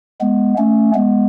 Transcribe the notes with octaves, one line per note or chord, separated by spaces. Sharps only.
G#3 B3
A3 C#4
G#3 B3